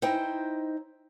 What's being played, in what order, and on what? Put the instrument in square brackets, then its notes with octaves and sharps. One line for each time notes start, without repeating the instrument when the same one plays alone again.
[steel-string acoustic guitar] D#4 E4 C5 D#5 G5